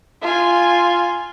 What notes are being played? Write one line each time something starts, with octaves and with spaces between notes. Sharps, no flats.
F4 G#5